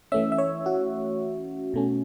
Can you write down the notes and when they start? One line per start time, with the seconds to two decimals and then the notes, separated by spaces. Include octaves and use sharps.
0.12 E3 A3 C#4 E5
0.32 E5
0.38 C#5
0.66 F#4
1.74 B2 A3 C#4